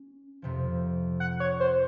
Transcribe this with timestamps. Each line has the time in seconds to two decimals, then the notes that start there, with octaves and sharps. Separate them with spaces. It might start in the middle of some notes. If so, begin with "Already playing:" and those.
Already playing: C#4
0.42 F2 C3 F3
1.20 F#5
1.40 C#5
1.60 C5